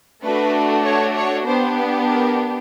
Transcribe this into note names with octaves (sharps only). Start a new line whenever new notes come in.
A3 D4 F#4 B4
C#5
C#5
B3 D4 G4 C5
B4
A#4